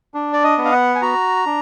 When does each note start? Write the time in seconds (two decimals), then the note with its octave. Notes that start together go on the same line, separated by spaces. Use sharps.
0.14 D4
0.33 D5
0.44 D#5
0.58 B3
0.65 F5
0.72 F#5
0.95 G#5
1.02 F#4 A#5
1.46 D4